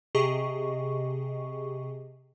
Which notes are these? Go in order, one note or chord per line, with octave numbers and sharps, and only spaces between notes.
C3 G4 G#4 D#5 C#6